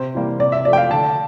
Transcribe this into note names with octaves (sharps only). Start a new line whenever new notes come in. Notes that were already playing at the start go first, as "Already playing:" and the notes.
Already playing: C3 C5
E3 G3 A#3
C3 D5
E5
F3 A3 D5
G5
F5
D3 A5